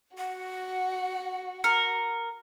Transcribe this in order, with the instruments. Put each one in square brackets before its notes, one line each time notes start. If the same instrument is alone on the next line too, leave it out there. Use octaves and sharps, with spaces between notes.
[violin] F#4 [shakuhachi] F#5
[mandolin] A#4 [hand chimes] C#7